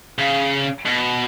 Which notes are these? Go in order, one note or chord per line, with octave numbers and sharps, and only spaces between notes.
C#3
B2